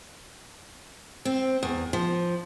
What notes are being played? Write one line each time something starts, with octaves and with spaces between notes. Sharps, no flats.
C4
E2
F3